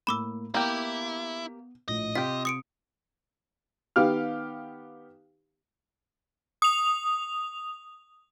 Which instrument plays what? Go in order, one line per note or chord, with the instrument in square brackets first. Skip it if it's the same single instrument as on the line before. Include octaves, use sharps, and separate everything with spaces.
[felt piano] A2 A#3 [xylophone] B5 D6 E6
[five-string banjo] A#3 G4 [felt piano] B3 [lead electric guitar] E4
[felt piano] A#1 A2 [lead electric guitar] D#5
[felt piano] C3 [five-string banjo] F4 G4 [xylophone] B6
[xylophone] D#6 C#7 D7
[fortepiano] D#3 B3 G4 F5 F6
[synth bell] D#6 F7